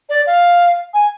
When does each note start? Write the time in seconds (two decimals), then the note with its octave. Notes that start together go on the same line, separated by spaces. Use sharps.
0.09 D5
0.26 F5
0.94 G#5